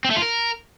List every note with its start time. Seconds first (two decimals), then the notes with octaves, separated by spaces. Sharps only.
0.05 C4
0.10 A3
0.16 F4
0.22 A#4